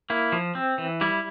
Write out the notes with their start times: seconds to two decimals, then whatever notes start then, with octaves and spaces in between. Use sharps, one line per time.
0.10 A#3 E4
0.32 F3
0.55 C4
0.78 E3
1.01 G3 E4